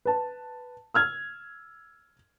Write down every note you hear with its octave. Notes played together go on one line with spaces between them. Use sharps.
B4 A5
E6 F6 G#6